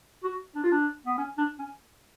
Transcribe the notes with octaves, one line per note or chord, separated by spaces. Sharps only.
F#4
D4
F4
D4
B3
C#4
D4
C#4